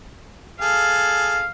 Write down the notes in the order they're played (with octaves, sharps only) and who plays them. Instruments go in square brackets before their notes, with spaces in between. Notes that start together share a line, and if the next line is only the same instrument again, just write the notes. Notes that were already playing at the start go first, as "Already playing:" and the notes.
[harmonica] G#4 A4 [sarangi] F5